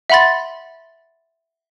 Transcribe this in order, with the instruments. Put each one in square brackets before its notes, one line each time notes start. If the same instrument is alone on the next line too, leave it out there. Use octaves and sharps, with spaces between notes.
[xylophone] E5 F#5 B5 C6 A6